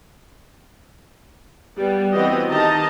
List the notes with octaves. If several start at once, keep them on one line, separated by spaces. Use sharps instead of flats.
G3 B3
E3 B3 C4 F#4 G4 D#5
D#3 G4 D#5 A5 A#5